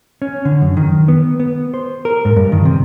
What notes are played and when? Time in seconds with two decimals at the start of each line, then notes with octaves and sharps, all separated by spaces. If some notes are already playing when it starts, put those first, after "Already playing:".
0.22 C#4
0.45 D3
0.62 F#2
0.77 D#3
1.08 B3
1.40 B3
1.74 C5
2.05 A#4
2.25 G#2
2.36 G2
2.52 D#3
2.65 C3